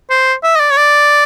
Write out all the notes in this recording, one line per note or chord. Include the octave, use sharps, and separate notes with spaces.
C5
E5
D#5
D5
C#5
D5